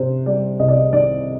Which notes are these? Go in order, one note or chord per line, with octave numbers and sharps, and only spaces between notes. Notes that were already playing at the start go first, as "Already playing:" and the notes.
Already playing: C3 C5
G3 D5
C2 D#5
D5
D#5
D#3 D5